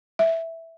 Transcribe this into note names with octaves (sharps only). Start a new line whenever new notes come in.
E5